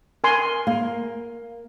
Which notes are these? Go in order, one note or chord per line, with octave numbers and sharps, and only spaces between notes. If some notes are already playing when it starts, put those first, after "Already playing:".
A#4 G#5 C6
A#3